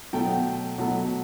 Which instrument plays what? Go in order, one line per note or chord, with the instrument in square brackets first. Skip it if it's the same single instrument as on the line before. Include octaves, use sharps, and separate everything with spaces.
[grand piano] B2 F#3 A3 G5
B2 F#3 A3